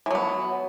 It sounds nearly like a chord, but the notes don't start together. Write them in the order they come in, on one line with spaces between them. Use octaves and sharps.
E3 F#3 B3